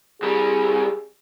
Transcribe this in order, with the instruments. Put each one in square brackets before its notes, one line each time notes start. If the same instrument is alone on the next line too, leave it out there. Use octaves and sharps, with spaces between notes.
[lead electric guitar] C2 G3 [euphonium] G#4